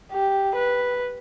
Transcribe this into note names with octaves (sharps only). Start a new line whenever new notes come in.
G4
B4